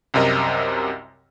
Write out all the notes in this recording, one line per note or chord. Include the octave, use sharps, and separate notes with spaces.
C2 F#2 C3 A#4 D#5